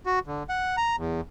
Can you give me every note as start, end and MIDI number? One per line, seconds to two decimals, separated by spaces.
0.06 0.19 66
0.27 0.43 50
0.49 0.76 78
0.77 0.96 82
0.97 1.21 40